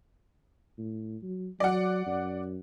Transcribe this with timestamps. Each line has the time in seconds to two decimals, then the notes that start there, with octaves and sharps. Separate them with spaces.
0.78 A2
1.22 F#3
1.60 F#3 D5 F#5
2.06 F#2